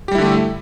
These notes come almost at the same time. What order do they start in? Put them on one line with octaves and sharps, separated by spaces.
G4 G3 E4 D3 A3